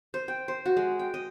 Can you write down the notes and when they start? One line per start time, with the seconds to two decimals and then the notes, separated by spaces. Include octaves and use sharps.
0.14 C5
0.28 G5
0.48 C5
0.66 F#4
0.77 G#3
0.99 G5
1.14 D#5